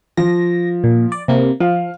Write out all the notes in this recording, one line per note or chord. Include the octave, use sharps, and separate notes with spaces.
F3 A#6
A#2
D5
C3 A#3
F3 F5